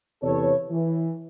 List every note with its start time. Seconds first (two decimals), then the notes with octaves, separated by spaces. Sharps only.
0.22 E2 C3 A4 B4 C#5
0.70 E3